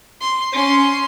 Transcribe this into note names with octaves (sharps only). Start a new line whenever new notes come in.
C6
C#4 C6